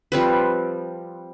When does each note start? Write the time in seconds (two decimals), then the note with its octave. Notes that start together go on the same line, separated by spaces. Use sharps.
0.12 F3 G3 C4 B4